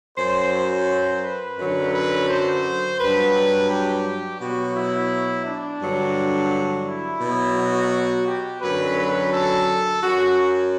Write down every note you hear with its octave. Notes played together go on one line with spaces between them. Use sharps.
F#2 F#3 C5
C5
B4
F#2 D3 F#3
B4
C5
G2 F#3 B4
G4
B2 F#3 F#4
E4
D4
G2 D3 F#3
E4
B2 F#3
F#4
G4
F#2 D3 F#3 B4
B4
A4
F#2 F#3 F#4